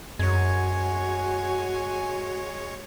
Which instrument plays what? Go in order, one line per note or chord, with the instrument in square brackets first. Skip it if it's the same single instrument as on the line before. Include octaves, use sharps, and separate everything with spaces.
[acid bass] F#2 [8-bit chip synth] G#3 C#5 [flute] F#4 [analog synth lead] G#5